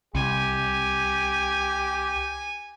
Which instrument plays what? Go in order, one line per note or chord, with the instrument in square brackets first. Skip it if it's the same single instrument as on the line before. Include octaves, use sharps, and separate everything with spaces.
[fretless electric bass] C2 [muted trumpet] G4 [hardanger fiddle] G#5